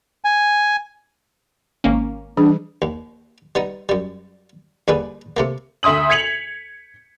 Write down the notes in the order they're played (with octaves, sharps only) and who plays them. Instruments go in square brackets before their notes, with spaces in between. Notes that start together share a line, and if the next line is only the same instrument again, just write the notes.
[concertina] G#5
[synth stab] G#1 A#3 C#4
[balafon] E3 G3 G#4 [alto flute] D4
[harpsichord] D#2
G3 B3 D#4
F#2 G3
D#2 D3 G3 G#4 B4
C3 A3 A#3
[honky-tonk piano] D2 E5 C6 D#6 F#7
G#6 B6 C#7 F7 F#7